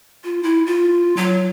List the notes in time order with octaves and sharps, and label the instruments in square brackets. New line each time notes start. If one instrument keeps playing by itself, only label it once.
[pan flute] F4
E4
F4
F#3